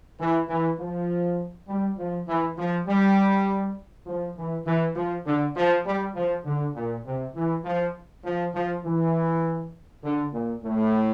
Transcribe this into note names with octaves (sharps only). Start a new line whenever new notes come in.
E3
E3
F3
G3
F3
E3
F3
G3
F3
E3
E3
F3
D3
F3
G3
F3
D3
A#2
C3
E3
F3
F3
F3
E3
D3
A#2
A2